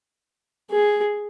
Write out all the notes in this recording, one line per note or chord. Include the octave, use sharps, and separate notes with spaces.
G#4